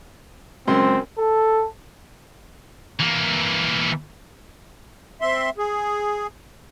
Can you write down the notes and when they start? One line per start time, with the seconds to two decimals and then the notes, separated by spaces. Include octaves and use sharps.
0.67 C#2 F#2 C4 C5
1.18 A4
3.00 E3 A#3
5.21 C4 E5 C6
5.58 G#4